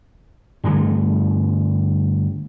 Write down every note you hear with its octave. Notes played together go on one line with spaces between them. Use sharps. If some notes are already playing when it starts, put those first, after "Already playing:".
G2 D3 E3 A3